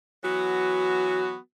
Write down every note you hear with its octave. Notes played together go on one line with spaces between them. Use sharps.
E3 F#3 B3 F#4